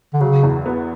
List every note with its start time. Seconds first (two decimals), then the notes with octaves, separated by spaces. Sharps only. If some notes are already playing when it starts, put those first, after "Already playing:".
0.13 D3
0.20 C#3 F#3
0.43 E2
0.66 B3